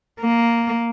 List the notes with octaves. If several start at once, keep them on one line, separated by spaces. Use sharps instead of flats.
A#3